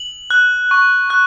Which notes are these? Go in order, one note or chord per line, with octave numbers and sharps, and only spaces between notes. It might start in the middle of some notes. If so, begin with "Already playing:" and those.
Already playing: F#7
F#6
C#6
F#6